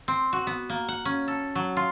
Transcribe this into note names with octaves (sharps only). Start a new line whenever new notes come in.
C4
F#4
B3
A#3
F#5
C#4
A4
F#3
F4